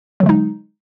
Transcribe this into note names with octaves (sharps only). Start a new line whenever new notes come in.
D3 F#3 G#3 D#4